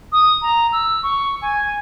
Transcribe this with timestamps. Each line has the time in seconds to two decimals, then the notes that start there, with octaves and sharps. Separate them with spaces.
0.12 D#6
0.42 A#5
0.72 E6
1.03 C#6
1.42 G#5